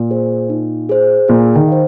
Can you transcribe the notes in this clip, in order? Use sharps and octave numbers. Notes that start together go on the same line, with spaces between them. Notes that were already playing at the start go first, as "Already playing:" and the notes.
Already playing: A#2
G#4 C5
D#4
G#4 C5
A#2 G#4
D#3
C5 F5